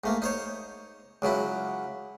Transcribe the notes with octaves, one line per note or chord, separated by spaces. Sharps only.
G#2 A3 A#3
D#4 C5 C#5
C#2 C#3 F#3 E4